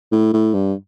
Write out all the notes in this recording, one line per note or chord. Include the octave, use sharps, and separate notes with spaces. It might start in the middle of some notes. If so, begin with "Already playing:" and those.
A2
A2
G2